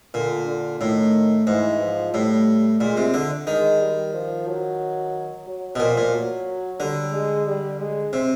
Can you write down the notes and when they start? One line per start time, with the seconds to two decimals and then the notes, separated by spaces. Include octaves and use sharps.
0.14 A#2 D3
0.47 D3
0.81 A2 D#3
1.47 G#2 E3
1.81 F3
2.14 A2 G3
2.80 A#2 G#3
2.97 C3
3.14 D3
3.47 D#3 G#3
3.80 G3
4.14 F3
4.47 F#3
5.47 F#3
5.75 B2
5.80 A#2 F3
5.97 A#2
6.13 F#3
6.80 D3 G3
7.13 G#3
7.47 G3
7.80 G#3
8.13 C3